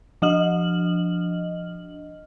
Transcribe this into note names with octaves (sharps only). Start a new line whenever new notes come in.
F3 D4 D#5 F6 F#7